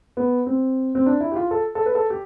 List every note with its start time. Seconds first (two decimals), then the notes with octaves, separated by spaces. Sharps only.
0.17 B3
0.46 C4
0.95 C4
1.06 D4
1.20 E4
1.32 G4
1.36 F4
1.51 A4
1.75 A4
1.86 B4
1.95 A4
2.10 G4